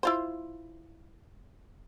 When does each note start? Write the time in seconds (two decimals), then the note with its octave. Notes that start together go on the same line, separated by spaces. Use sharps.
0.03 E4 F4 C5